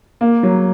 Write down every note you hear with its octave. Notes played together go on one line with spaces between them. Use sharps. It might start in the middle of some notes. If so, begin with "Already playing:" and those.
A#3
F#3